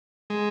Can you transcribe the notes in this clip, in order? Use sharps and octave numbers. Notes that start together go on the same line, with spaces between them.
G#3